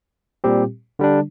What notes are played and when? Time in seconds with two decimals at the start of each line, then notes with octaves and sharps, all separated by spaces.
0.44 A#2 G3 C4 G4
0.99 D3 G3 D4